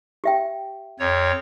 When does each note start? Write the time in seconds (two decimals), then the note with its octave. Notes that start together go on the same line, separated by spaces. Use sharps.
0.24 G4 E5 G5
1.00 F2 C#5